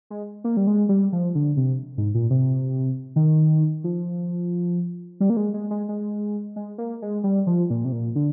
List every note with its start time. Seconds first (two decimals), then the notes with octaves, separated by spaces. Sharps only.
0.10 G#3
0.44 A#3
0.57 G3
0.67 G#3
0.89 G3
1.12 F3
1.35 D3
1.57 C3
1.98 G#2
2.15 A#2
2.30 C3
3.16 D#3
3.84 F3
5.20 G3
5.30 A#3
5.37 G#3
5.54 G#3
5.71 G#3
5.89 G#3
6.56 G#3
6.78 A#3
7.02 G#3
7.24 G3
7.47 F3
7.70 A#2
7.85 C3
7.92 A#2
8.16 D3